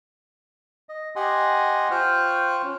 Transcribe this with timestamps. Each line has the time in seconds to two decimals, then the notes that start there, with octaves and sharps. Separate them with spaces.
0.89 D#5
1.16 G4 D#5 F#5 G#5 C6 D#6
1.91 F4 C5 G5 C#6 F6 F#6
2.64 C#4